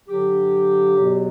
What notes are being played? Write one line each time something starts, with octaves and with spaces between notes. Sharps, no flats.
G2 D3 F#3 G4
E2 B2 F#3